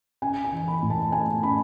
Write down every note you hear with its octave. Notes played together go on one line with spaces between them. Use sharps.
C#4 G#5
G#5
E3
B5
A2
A5
A3 G#5
C#4 B5